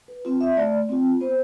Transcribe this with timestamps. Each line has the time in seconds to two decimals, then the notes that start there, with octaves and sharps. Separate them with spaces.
0.08 B4
0.25 C4 F4
0.41 E5
0.57 A3 D5
0.89 C4 F4
1.21 B3 C5